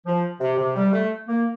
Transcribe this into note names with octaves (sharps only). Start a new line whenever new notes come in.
F3
C3
C3
G3
A3
A#3